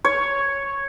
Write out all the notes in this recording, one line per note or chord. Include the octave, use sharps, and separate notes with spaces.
C#5